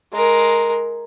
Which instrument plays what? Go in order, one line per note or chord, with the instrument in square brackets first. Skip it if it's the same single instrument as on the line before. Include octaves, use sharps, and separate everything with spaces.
[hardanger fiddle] G#3 A#4